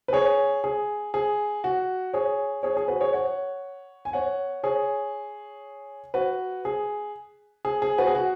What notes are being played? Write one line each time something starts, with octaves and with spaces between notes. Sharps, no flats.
B4
G#4 C#5
G#4
G#4
F#4
G#4 C#5
G#4 C#5
G#4
F#4 B4
G#4 C#5
C#5 F#5
G#5
C#5 F#5
G#4 C#5
F#4 B4
G#4
G#4
G#4
F#4 B4
G#4
F#4